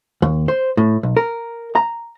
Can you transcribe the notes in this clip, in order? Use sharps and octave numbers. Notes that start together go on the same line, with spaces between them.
D#2
C5
A2
B1
A#4
A#5